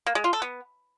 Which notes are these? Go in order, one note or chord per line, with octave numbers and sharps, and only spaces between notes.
A#3
G#3
F4
A4
B3